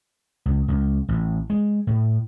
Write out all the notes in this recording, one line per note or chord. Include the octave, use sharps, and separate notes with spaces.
C#2
C#2
A1
G#3
A2